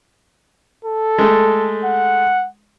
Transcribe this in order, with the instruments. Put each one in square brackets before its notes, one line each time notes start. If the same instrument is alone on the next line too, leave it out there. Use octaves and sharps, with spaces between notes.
[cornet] A4
[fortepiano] G#3 A3
[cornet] F#5